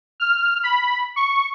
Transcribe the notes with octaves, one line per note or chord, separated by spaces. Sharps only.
F6
B5
C#6